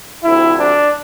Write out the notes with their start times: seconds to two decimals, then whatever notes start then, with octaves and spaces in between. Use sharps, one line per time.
0.24 D2 C3 F3 E4
0.58 D4